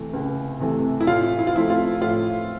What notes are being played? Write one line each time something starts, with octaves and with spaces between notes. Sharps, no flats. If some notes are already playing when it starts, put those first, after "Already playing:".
Already playing: C3 E3 A3
C#2
C3 E3 A3
E4
A2 F4
E4
F4
F3 A3 C4 E4
F4
A2 F4